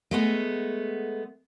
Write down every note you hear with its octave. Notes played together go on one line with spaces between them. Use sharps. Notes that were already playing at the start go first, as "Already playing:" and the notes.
G#3 A3 B3